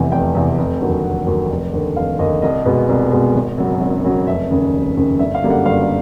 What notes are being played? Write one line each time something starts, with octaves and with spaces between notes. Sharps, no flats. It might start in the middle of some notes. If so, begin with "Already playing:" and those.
Already playing: F1 E2 C3 E3
F1 G5
E2 C3 E3
F1
D#2 D3 F#3
F1 F#5
D#2 D3 F#3
F1
D#2 D3
F1 F5
D#2 D3 D#5
C2 D#5
B2 G#3 B3
C2
B2 G#3 B3
G#1
F#2 C#3 F#3
G#1
F#2 C#3 F#3
F1 E5
D#2 C#3
F1
D#2 C#3
G1 E5
F5
F#2 D3 G3 A#3
F#5
G1 F5